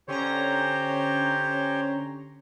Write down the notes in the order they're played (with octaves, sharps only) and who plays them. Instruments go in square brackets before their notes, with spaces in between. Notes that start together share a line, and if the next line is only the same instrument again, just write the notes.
[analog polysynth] D3 C#4 A#5 [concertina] G4 C5 C#5